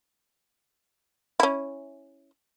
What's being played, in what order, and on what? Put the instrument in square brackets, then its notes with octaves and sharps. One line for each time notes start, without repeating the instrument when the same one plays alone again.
[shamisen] C#4 E4